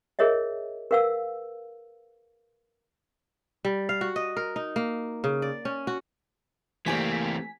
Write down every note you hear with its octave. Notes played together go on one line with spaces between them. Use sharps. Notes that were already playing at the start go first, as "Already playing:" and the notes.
G#4 A#4 C#5 D#5 E5
A#4 B4 F5 F#5 E6
G3
F5
F#4
D#5
A#4
D#4
A#3
C#3
D5
C#4
F#4
E3 A3 A#3 C4 G4 D5 G#5 B6